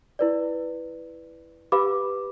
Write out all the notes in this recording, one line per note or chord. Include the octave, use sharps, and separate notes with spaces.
E4 B4 D5
G4 B4 F5 B5 D6